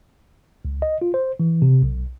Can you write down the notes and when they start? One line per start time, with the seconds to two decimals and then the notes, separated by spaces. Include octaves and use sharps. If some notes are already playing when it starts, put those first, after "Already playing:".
0.65 C#2
0.82 D#5
1.02 F4
1.14 C5
1.40 E3
1.62 C3
1.83 B1